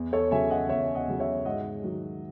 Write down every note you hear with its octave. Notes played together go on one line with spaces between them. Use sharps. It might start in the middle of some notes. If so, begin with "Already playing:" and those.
Already playing: E2
A4 C#5
C#3 F#3 E5 G#5
D#5 F#5
E2 C#5 E5
D#5 F#5
C#3 F#3
C#5 E5
G#2 D#5 F#5
D#3 F#3